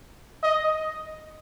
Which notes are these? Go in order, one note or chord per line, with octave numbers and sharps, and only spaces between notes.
D#5